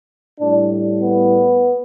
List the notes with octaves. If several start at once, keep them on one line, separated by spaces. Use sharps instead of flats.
A2 G3 D4
B3